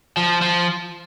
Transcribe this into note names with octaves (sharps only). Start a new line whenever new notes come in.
F3
F3